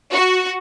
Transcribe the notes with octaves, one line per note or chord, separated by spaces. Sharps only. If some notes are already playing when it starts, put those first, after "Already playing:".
F#4